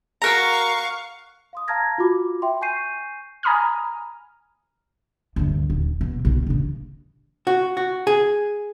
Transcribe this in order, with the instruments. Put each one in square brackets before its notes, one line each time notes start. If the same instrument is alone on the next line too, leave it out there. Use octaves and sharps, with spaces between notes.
[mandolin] F#4 A#4 A#5 [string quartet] F5 C#6 [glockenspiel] F6 F#6 F7
[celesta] F5 C6 D#6
F5 A5 A#5 F6 G#6 A#6
F4 F#4 B5 D6
E5 G5 C6
G#5 C#6 G6 C7 D#7
[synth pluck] G#5 A#5 B5 D#6 F6
[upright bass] D2 G2
D#1
B2
B1 C3
A#1 C#3
[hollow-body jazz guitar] F#4
F#4
G#4